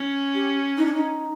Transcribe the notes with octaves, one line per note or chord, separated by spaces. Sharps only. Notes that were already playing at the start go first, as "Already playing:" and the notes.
Already playing: C#4
G4
D#4
D4
D#4